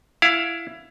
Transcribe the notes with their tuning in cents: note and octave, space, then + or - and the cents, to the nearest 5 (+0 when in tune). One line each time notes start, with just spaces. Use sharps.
E4 +20 F5 +20